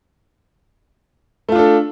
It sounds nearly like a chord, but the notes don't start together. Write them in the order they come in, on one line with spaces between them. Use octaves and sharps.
A3 F4 D4 A4